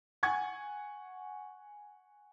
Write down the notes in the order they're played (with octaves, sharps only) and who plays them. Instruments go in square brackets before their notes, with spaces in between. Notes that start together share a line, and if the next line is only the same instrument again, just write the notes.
[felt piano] F#5 G#5 C#6 G#6